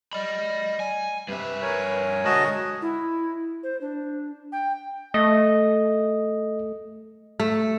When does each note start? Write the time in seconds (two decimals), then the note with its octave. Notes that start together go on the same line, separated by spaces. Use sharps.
0.13 D5 D#5 B5
0.80 G#5
1.28 G2 C3 B4 E5
1.62 A#4 C#5 G#5
2.25 D3 G#3 F#4 D#5 A5 D#6
2.82 E4
3.63 C5
3.81 D4
4.52 G5
5.14 A3 D#5
7.40 A3